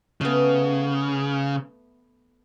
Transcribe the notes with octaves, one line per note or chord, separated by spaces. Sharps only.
C#3 A3 B3